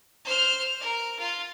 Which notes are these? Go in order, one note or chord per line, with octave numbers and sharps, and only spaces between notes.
C5 F6
A#4
F4